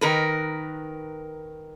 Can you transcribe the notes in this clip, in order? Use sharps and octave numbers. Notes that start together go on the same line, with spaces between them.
D#3 A#4 B4